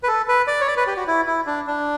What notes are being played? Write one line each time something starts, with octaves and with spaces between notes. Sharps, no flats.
B4
A4
B4
D5
C#5
D5
B4
G4
F#4
E4
E4
D4
D4